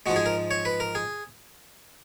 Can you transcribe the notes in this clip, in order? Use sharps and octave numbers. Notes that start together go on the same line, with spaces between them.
G#2 F3 G#3 F#4
G#4
A#4
C#5
B4
A#4
G#4